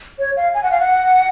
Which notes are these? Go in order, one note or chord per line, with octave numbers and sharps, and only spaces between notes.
C#5
F5
G#5
F#5
F5
F#5